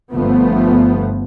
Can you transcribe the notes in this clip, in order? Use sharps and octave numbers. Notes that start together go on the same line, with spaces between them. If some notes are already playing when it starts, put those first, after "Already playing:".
G1 F3 A3 B3